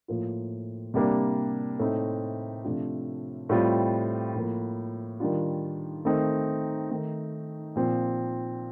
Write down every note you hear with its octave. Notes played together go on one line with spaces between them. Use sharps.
A2 F3 A#3 F4
C3 G3 A#3 D4
A2 A3 C4 D#4
C3 F3 A3 D4 F4
A2 G3 C4 F4
A2 F3 A#3
D#3 G3 D4 F4
D#3 A3 C4 D#4
D#3 A3 D#4
A#2 F3 C4